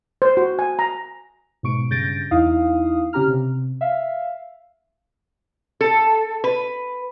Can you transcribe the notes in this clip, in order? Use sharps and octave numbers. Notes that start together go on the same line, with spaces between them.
C5
F#4
G#5
A#5
G#2 B2 C#6 D7
G2 C#3 G6 A6 A#6 D7
E2 D#4 E4 F5 D#6
C#3 C#4 G4 A#5 F6
C3
E5 F5
A4
B4